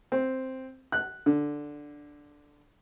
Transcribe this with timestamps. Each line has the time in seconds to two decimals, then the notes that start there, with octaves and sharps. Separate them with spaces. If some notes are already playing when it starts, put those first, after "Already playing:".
0.12 C4
0.92 F#6
1.26 D3